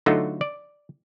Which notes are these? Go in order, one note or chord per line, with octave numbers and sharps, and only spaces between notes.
D3 F#3 A3 D#4 F4 F#4
D5